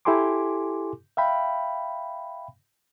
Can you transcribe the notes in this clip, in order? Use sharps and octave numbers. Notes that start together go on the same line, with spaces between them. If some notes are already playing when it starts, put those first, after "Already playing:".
E4 G4 A4 G#5 C6 D6
E5 F5 G5 B5